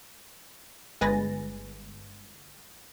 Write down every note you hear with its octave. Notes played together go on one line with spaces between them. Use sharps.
G1 G#3 B4 G#5 A6 A#6